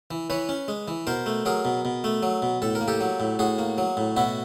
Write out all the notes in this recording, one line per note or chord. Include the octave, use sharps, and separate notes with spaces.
E3
E3 B4 C#5
C#4
G#3
E3
B2 A#4 C5
A3
F#3 G#4 A#4
B2
B2
A3
F#3
B2
A2 A4
A#4
A#3
G4 A4
F#3
A2
A2 F#4 G#4
A#3
F#3
A2
B2 E4 F#4